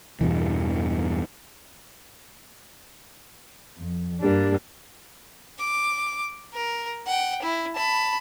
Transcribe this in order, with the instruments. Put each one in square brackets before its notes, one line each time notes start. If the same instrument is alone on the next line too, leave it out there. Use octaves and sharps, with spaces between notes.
[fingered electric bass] E2 G2 B2 E3
[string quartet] F2
G2 G3 A#3 D4
[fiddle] D6
A#4
F#5 G5
E4
A5 B5